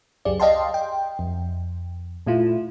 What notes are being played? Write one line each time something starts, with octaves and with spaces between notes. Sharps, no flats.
C#2 F#2 G4 G#4 D5
D5 D#5 F5 G5 A5 C6
G5
F2
A#2 A3 E4 F4